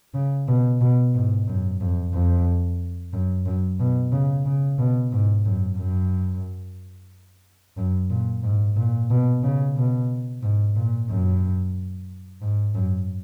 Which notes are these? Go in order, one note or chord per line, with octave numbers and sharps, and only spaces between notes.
C#3
B2
B2
G#2
F#2
F2
F2
F#2
F#2
B2
C#3
C#3
B2
G#2
F#2
F#2
F#2
A#2
G#2
A#2
B2
C#3
B2
G#2
A#2
F#2
G#2
F#2